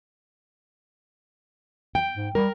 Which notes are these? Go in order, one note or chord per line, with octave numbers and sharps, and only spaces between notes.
G5
G#2
G3 A#4